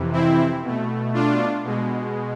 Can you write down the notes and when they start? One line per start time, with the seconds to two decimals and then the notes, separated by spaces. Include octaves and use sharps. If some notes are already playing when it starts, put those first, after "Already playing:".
Already playing: F2 C3 E3
0.13 C4 E4
0.63 B2 A3
1.14 D4 F4
1.64 B2 G#3